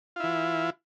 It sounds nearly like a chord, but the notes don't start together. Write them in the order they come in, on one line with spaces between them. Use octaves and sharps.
F4 E4 E3